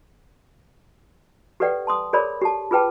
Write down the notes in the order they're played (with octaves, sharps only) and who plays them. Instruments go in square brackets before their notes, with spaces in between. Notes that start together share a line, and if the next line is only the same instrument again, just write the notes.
[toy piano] G4 A4 B4 D5 F#5 G5
A5 C6 D#6
G#4 A#4 C#5 D5 B5
G4 A4 A5
F4 G#4 B4 G5 A5